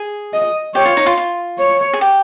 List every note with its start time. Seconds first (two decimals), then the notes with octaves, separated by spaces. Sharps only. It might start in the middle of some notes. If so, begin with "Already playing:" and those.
Already playing: G#4
0.33 D#5
0.75 G4 C#5
0.86 F4
0.97 D#4
1.06 F4
1.17 F4
1.59 C#5
1.93 G#4
2.01 G4